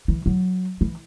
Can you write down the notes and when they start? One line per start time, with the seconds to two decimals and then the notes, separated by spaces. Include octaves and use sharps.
0.08 E3
0.26 F#3
0.81 E3